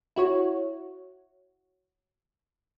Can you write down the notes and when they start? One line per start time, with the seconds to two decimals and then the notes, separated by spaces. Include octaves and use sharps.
0.16 E4 F#4 C#5